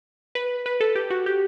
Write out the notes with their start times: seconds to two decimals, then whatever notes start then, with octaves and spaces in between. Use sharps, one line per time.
0.35 B4
0.66 B4
0.81 A4
0.96 G4
1.11 F#4
1.26 G4